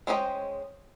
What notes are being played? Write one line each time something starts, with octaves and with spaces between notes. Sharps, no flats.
G#3 C#4 C5 D#5 G5